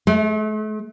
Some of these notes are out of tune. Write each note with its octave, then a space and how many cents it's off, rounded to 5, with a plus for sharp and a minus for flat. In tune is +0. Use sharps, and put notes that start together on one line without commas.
A3 -40